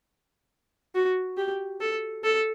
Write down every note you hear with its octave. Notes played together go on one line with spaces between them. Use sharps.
F#4
G4
A4
A4